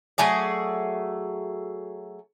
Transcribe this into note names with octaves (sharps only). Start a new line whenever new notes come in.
F#3 A3 G#4 D5